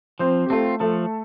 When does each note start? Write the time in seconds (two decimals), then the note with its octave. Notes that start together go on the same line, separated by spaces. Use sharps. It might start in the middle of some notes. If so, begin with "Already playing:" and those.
0.19 F3 C4 C5
0.46 G4
0.50 A3 C4 F4 A4
0.80 F3 A3 A4